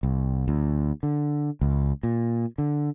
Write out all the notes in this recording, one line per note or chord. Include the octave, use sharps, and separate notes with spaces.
C2
D2
D3
C#2
A#2
D3